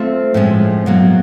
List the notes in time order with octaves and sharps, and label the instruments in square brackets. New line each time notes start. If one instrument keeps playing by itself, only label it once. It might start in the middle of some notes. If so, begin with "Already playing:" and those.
Already playing: [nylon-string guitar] A3 C4 F4 A4 C5
A2 F3 G#3 C#4
B2 F#3 A#3